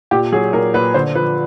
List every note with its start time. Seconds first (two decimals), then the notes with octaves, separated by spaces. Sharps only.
0.11 A#2 G4
0.32 F#3 G#4
0.53 A#2 A#4
0.74 A#2 B4
0.94 D3 C5
1.15 F3 B4